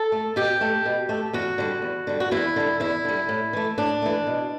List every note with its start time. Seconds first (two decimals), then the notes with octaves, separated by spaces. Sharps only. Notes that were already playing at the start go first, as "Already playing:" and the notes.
Already playing: A4
0.12 A3
0.36 B2 G4
0.61 A3
0.86 B2
1.09 A3
1.33 E2 F#4
1.58 D3 G3
1.82 E2
2.07 D3 G3
2.20 F#4
2.31 E2 E4
2.56 D3 G3
2.80 E2 E4
3.05 D3 G3
3.29 A2
3.53 E3 A3
3.78 A2 D4
4.02 E3 A3
4.27 B2